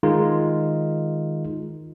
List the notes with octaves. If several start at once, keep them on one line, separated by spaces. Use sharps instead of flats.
D#3 G#3 D#4 F4